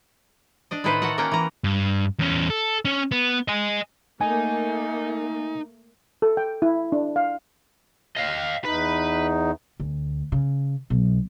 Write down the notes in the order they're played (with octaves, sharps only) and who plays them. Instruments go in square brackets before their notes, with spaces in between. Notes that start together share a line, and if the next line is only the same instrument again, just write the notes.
[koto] D4 D5 D#5
A2 D#3 E4 A4 B4 C5
F#4 A4 A#4 F#5
A#3 C#4 A#4 F#5 G5
E3 A#5
[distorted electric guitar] G2
E2 C#4
A4
C#4 C#5
B3
D#5 G#5
[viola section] A3 A#3 [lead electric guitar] D#4 [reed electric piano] G#5
[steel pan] A4
G5
E4
D4
F5
[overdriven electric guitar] D#5 F5
[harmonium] E2 D#4 [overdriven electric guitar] B4
[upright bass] D2
C#3
B1